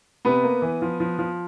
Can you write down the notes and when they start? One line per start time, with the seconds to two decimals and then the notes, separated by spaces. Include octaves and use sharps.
0.25 C3 B3 B4
0.44 A#3
0.62 E3
0.82 F3
1.00 F3
1.19 F3